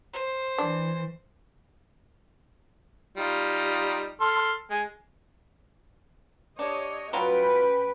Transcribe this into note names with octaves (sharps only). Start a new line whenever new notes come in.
C5
E3 D4
G3 D#4 F4
A4 C6 F6
G#3 G#5
D4 G4 C#5 D#5
F#3 G3 C#4 F4 F#4 B4 G5